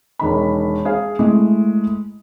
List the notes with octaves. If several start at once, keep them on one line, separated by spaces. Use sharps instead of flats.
E1 D#3 B5
G#4 F5
G#3 A3 E4